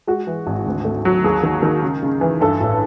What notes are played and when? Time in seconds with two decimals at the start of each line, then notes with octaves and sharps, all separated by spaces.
0.07 G#3 F#4
0.27 E3
0.47 G#1
0.67 D2
0.85 A3
1.05 F#3
1.24 D#2 G#4
1.43 D#3
1.63 D#3
1.82 C#3
2.03 C#3
2.21 E3
2.41 G2 A4
2.61 A1